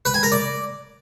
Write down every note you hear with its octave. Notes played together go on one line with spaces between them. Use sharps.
B4
G#5
A#4
D5